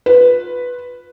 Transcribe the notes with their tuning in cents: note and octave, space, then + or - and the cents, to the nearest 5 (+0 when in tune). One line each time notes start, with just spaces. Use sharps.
F4 +20 B4 +0